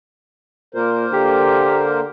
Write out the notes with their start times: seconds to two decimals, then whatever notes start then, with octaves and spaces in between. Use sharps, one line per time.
0.75 A#2 A#3 A#4 C5
1.13 D3 G4